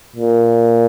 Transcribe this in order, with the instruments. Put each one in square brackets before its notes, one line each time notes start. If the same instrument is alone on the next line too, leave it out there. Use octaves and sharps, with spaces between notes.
[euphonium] A#2